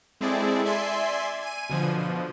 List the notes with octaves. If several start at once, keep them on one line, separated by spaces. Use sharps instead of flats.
G#3 C4 E4 G#4 A4 D5
D5 E5 G#5 C6
G#5 D#7
B2 D3 F3